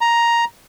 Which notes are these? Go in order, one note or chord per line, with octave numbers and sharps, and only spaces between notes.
A#5